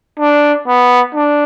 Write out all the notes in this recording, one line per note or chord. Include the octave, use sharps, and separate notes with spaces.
D4
B3
D4